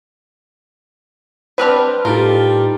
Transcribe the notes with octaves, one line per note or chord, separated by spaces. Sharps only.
G3 C4 D4 B4 F6
A2 G3 D#4 F4 G4 A4 A#4